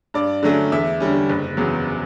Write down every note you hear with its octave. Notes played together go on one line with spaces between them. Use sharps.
G2 D5
D3 F#3 A3 C#4
E2 E5
D3 G3 C#4
F#1
E2 C#3 F#3 B3